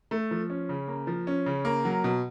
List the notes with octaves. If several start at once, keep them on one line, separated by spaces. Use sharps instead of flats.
A3
F3
C#4
C#3
A#3
F3
C#4
C#3
A#3
F#3
B2